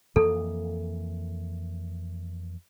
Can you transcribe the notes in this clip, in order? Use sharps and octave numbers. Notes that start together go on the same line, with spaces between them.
F2 E3 A#3 A4